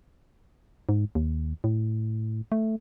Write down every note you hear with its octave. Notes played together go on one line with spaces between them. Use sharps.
G#2
D#2
A2
A3